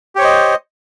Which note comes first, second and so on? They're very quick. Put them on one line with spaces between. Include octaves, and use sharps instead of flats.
G4 C#5 C5 D#5